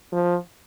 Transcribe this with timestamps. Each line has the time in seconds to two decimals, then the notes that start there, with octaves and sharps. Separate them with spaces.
0.13 F3